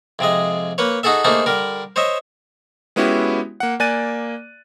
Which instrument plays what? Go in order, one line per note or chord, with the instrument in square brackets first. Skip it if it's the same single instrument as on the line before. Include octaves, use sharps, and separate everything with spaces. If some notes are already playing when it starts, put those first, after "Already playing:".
[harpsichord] F2 C3 G#3 D#5
A#3 B4 C#5
D#4 F#4 G#4 A4 E5
A3 A#3 D4 D#4 G#4 C5
D3 G3 A#4
C5 C#5 D#5 E5
[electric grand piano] G#3 B3 C#4 E4 F#4 G4
A#3 F#5
A#3 D5 G#5 F#6 A6 D#7